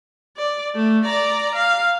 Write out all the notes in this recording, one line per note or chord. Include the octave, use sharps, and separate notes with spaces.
D5
A3
D5 A#5
F5